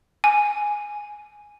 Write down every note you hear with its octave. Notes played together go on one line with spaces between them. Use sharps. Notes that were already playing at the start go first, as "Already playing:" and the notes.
G#5